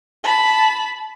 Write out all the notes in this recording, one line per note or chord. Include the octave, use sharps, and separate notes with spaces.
A5 B5